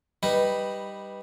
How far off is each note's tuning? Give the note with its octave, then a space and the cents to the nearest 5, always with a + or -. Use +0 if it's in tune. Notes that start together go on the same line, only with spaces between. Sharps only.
G3 +0 D#4 -5 B4 +0